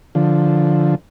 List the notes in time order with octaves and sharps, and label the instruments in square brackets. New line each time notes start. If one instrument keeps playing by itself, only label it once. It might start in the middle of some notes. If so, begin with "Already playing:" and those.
[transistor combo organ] D3 F3